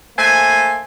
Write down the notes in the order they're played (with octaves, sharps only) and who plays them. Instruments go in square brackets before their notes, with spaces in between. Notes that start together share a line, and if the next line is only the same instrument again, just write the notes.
[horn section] A3 A#3 C5 G#5